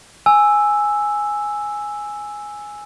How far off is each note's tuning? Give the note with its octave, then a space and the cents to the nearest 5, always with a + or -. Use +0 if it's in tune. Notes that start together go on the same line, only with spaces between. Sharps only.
G#5 +0 E6 +0